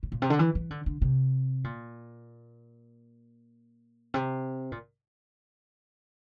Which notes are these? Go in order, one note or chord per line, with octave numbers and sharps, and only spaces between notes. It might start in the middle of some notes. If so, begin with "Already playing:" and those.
A2
A#2
C3
D3
E3
E3
D3
D3
C3
A#2
C3
A#2